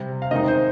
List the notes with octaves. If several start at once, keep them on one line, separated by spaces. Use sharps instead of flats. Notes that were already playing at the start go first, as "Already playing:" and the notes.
Already playing: C3 G3 C4
F5
D#3 G#3 C4 D#4 D#5
C5